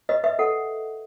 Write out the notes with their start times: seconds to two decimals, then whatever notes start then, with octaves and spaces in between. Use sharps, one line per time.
0.09 B4 D#5
0.24 B4 E5
0.39 A4 F#5